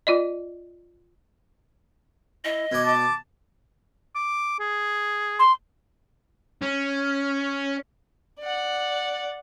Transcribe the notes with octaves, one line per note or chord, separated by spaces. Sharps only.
F4 D5 D#5
E4 D#5
B2 D5 G#6
A5 D6
D6
G#4
C6
C#4
D5 F#5